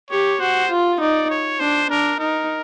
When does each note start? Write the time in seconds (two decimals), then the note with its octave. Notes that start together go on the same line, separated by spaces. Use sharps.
0.10 G4 C#5
0.40 F#4 C5
0.70 F4
1.00 D#4 D5
1.30 C#5
1.60 D4 C5
1.90 D4 A#4
2.19 D#4 A#4